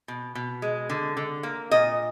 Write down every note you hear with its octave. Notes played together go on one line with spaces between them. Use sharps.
B2
B2
G#3
D3
D3
A#3
A#2 D#5